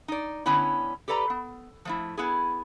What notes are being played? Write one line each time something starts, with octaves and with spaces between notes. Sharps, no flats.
D#4 D5
D3 B3 C#4 E4
G4 A4 B4 D5 A#5
B3
F3 A3 E4
B3 E4 G#4